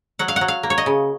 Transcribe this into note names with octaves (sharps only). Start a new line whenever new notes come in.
F#3 F#5
F5
F#5
F#3
F5
A#3
C#5
D#5
C#3